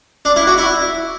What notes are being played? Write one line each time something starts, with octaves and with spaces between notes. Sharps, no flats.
D4
E4
F#4
E4